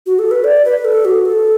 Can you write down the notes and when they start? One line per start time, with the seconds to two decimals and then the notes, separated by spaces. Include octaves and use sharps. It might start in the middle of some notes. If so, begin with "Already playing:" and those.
0.06 F#4
0.19 A4
0.31 B4
0.44 D5
0.65 B4
0.85 A4
1.05 F#4
1.25 A4